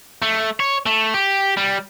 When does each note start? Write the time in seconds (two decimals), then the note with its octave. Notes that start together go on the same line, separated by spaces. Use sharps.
0.22 A3
0.60 C#5
0.86 A3
1.14 G4
1.57 G3